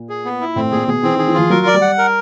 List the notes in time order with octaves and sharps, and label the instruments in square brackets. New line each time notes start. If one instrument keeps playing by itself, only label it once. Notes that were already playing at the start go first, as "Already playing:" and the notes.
Already playing: [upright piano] A#2
[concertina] G#4
B3
E4
[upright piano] A2 [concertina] C4
[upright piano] A#2 [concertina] G#4
[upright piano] B2 [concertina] G#4
[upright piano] E3 [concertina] C4
[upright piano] D#3 [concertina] G#4
[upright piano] E3
[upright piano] F3 [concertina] F4
[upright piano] F#3 [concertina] A#4
[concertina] D5
[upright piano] G3
[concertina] F#5
A#4